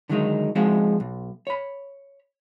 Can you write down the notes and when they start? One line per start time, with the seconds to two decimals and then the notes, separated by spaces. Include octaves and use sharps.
0.09 D3 D#3 F#3 G#3 C#4 D#4
0.55 F3 G#3 C4 D#4 F#4
1.00 B1
1.47 C#5 B5